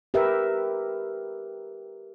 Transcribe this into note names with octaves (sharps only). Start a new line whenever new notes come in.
G4 A#4 B4 E5